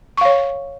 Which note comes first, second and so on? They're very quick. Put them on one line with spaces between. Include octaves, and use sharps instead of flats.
C#6 F5 C#5